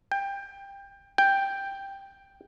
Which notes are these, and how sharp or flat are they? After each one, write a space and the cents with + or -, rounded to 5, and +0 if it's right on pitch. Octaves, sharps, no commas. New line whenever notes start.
G5 +20
G5 +5